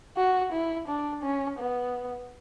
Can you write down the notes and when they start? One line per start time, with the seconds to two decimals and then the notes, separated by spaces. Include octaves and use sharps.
0.17 F#4
0.52 E4
0.88 D4
1.23 C#4
1.58 B3